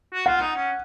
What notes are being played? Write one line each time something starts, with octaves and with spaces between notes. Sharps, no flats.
F#4
F4 F#5
D#4
C#4